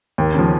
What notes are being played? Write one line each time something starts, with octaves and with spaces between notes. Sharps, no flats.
D#2
C#3 F3